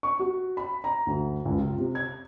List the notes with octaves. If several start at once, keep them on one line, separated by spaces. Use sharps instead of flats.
C#6
F#4
B5
A#5
D2
C#2
F4
C3
G#6